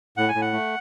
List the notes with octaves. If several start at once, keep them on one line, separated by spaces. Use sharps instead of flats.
A2 F#5
G#5
A2
F#5
A3